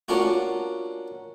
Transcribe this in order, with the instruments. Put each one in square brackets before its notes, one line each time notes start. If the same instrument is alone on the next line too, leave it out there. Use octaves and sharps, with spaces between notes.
[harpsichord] A#3 C#4 D4 F4 F#4